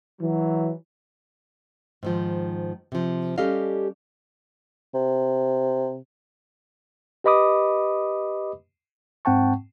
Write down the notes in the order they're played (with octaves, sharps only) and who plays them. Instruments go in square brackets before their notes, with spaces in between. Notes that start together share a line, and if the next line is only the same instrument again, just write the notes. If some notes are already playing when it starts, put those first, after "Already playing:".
[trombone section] E3 F#3
[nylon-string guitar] G#2 D#3 F3
C3 F3
G3 C#4 G4 A4 D#5 F5
[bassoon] C3
[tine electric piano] G4 B4 D#5 B5 D6 D#6
G#2 C4 F#5 G5 A5 C#6